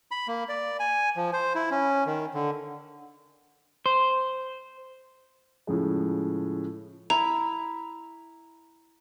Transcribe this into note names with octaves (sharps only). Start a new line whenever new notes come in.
B5
A#3
D5
G#5
F3
C5
E4
C#4
D#3
D3
C5
A2 C#3 F3 G#3
E4 A#5